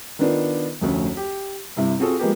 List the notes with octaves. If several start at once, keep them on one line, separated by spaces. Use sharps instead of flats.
D#3 B3 D4 F4
F1 D2 C#4
G4
G2 C3 E4
C4 F4 F#4 G#4 A4
F3 G#3 A#3 B3 G4